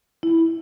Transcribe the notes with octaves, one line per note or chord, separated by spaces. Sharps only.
E4